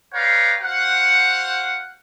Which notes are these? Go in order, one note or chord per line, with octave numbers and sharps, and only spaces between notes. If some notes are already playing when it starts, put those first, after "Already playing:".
B4 C#5 D5 F5 G5 A#5
F#4 C5 F5 F#5